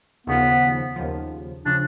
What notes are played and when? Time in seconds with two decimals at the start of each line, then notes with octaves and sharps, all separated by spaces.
0.27 D#2 C#3 F3 B3
0.96 D#2 C#3 F3
1.66 C#3 F3 D4